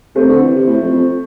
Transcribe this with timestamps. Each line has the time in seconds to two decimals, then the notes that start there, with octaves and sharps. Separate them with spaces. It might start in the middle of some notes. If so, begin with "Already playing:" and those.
0.15 C3 A3 C4
0.28 D3
0.41 E3
0.54 C3
0.67 A2
0.80 F2
0.93 F2